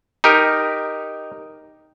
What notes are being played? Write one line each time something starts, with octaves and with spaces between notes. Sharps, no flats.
D#4 G4 A#4